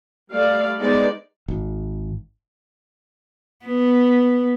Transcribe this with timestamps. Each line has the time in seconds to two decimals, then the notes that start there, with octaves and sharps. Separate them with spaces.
0.32 G3 A3 D5 F5
0.79 G#3 B3 D#4 C5 D5
1.48 G#1
3.65 B3